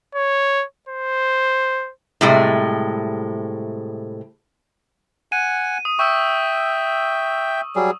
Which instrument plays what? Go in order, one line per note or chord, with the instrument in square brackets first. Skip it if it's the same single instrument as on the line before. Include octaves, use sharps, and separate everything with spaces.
[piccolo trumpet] C#5
C5
[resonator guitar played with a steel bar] A2 C3 G3 G#3
[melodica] F#5 G#5 [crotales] D#7
[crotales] D#6
[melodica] E5 G5 [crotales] C#6 E6
[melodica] F#3 G3 G#4